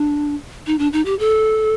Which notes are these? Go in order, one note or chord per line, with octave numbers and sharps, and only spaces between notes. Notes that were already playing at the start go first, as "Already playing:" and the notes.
Already playing: D4
D#4
D4
D#4
G4
A4